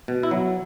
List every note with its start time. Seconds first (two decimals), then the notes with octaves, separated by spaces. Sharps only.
0.08 B2
0.23 E4
0.31 F#3